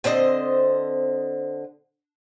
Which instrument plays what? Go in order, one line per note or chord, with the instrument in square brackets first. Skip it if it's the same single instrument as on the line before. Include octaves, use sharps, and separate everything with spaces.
[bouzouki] D3 C4 C5 D#5